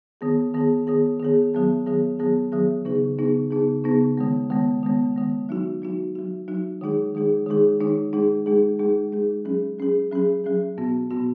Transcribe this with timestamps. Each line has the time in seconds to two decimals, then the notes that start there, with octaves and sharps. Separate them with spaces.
0.21 D#3 B3 G#4
0.54 D#3 B3 G#4
0.87 D#3 B3 G#4
1.20 D#3 B3 G#4
1.54 D#3 F#3 B3 G#4
1.86 D#3 F#3 B3 G#4
2.19 D#3 F#3 B3 G#4
2.52 D#3 F#3 B3 G#4
2.85 C#3 B3 D#4 G#4
3.18 C#3 B3 D#4 G#4
3.51 C#3 B3 D#4 G#4
3.84 C#3 B3 D#4 G#4
4.17 D#3 G#3 B3
4.50 D#3 G#3 B3
4.83 D#3 G#3 B3
5.16 D#3 G#3 B3
5.49 F#3 D#4 F#4
5.82 F#3 D#4 F#4
6.15 F#3 D#4 F#4
6.48 F#3 D#4 F#4
6.81 D#3 G#3 D#4 G#4
7.15 D#3 G#3 D#4 G#4
7.47 D#3 G#3 D#4 G#4
7.80 D#3 G#3 D#4 G#4
8.13 G#3 D#4 G#4
8.46 G#3 D#4 G#4
8.79 G#3 D#4 G#4
9.12 G#3 D#4 G#4
9.45 F#3 C#4 G#4
9.79 F#3 C#4 G#4
10.11 F#3 C#4 G#4
10.44 F#3 C#4 G#4
10.78 B2 B3 F#4
11.11 B2 B3 F#4